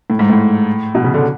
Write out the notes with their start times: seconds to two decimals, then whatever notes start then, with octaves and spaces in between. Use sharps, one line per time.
0.10 A2
0.19 G#2
0.30 A2
0.95 B2
1.04 C#3
1.14 D3